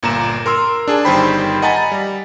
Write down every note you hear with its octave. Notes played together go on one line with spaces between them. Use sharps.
G1 A#2 A#5 E7
A#4 C6 E6
D4 G#4 A5
G1 D#3 G3 C5 G5 B5
D#5 F#5 G#5 A#5 B5 A6
G3